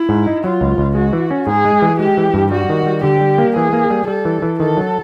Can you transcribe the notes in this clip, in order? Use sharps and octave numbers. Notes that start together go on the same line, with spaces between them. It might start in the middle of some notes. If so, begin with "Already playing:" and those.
Already playing: E4
G#2
D#4
F#3 F4
C#2
C#2
G#3 F#4
E3
C#4
G#2 G#4
G#3
E3
G#3 G4
E3
G2
G3 F#4
D#3
G3
D3 G4
G3
A#3
E3 G#4
A#3
G3
G3 A4
E3
E3
D#3 A4
F#3